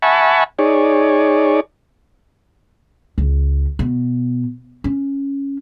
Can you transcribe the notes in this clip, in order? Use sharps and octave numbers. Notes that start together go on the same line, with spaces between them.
E5 F#5 G#5 A5 B5 C#6
D#4 G#4 C#5 D5
C#2
B2
C#4